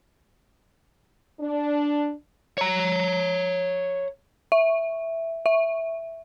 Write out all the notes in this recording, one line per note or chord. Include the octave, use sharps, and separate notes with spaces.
D4
C#5 A#5
E5
E5